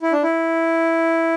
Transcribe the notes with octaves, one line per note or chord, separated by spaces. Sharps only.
E4
D4
E4